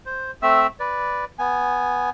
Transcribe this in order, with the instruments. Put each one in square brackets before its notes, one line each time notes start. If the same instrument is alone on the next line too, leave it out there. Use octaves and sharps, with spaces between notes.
[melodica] C5
A3 C4 E5 E6
B4 D5
B3 G#5